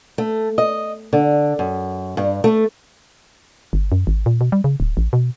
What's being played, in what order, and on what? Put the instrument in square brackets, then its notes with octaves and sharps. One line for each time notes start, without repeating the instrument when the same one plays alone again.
[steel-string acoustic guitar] A3
D#5
D3
F#2
G2
A3
[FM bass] G1
F#2
G#1
A#2
B2
G3
C#3
D1
A1
B2